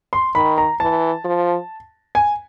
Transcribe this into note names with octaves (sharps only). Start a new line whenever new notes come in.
C6
D#3 B5
A#5
E3 A5
F3
G#5